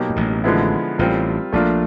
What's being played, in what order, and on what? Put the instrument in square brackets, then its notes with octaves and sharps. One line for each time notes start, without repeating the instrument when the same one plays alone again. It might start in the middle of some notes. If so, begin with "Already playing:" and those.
Already playing: [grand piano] B2 F#3 A#3 D#4 G4
[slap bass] A#2
A1 A2
[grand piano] D3 F3 G#3 B3 E4
[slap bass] A1 A2 [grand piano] G3 C4 F4 A#4
[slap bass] A#1 A#2 [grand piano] A3 D4 F4 A#4